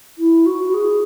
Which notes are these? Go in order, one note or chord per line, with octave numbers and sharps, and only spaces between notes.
E4
F#4
F#4
G#4